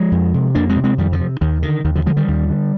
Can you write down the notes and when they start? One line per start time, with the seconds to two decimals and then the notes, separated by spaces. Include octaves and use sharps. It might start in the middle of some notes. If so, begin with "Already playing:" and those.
Already playing: F3 G#3
0.12 F2
0.34 C3
0.55 F2 A#3 D4
0.69 G#3 C4
0.76 C3
0.84 G#3 C4
0.98 F2 D#3 G3
1.13 D3 F3
1.20 C3
1.41 D#2 D#3
1.62 D3 D#3
1.84 D#2 D#3
1.95 D3 F3
2.06 D3 F3 G#3
2.17 D#3 G3
2.28 D#2
2.49 D3